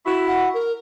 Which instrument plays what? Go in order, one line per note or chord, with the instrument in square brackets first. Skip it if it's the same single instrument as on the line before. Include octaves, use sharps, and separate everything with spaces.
[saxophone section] E4 F#4
[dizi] F#5
A#4